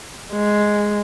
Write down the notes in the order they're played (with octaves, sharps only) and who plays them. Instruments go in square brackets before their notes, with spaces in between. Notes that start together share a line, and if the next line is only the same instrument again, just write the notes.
[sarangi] G#3